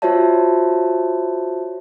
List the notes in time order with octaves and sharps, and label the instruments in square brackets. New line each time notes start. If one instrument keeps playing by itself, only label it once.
[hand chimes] F4 F#4 C5 C#5 E5 A5